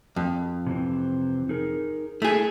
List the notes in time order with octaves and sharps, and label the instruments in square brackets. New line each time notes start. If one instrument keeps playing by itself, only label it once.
[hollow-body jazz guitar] F2
[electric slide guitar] C3 E3 C4
D#4 G#4 A#4
[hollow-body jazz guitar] A3 G#4 [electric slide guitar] E4